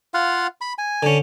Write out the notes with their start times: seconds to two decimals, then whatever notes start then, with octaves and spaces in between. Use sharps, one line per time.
0.14 F4 F5 F#5
0.61 B5
0.78 G#5
1.03 D3 C#4